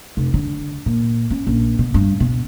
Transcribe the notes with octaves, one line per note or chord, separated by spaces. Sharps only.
F1
D3
A#2
C#4
A#1
B2
G2
B2